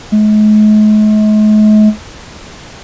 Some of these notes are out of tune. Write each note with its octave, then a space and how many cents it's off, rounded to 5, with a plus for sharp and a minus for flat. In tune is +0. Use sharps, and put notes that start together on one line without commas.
G#3 +45